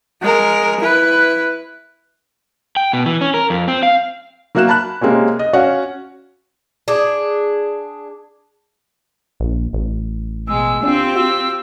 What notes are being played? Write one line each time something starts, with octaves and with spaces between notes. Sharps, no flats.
G#3 A#4
E4 B4
G5
B2
E3
C#4
A#4
F2
C4
F5
F#3 A#3 F#4 E5 F#6 E7
A5 B5 F#6
C3 G#3 A#3 C4 C#4
D#5
C#4 F#4 C#5 F5 F#5
D4 G#4
A#1
A1
B2 G#3 E6
C4 D4 F4 G4
F#4 E6